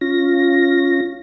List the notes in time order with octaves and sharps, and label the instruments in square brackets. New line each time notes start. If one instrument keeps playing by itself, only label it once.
[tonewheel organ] C#4 F4 A#6